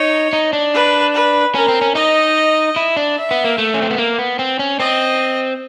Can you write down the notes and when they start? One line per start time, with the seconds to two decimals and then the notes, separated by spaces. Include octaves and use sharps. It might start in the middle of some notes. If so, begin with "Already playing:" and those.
Already playing: D#4 C#5
0.33 D#4
0.53 D4
0.74 B4
1.14 B4
1.55 C#4 A#4
1.68 C4
1.81 C#4
1.95 D#4 D#5
2.76 E4
2.97 D4
3.18 E5
3.31 B3
3.44 A#3
3.58 A3
3.74 C#4
3.82 C4
3.90 B3
3.98 A#3
4.18 B3
4.39 C4
4.59 C#4
4.79 C4 D#5